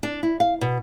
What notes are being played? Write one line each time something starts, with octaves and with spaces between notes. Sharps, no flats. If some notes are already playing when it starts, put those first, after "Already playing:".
D4
E4
F5
B2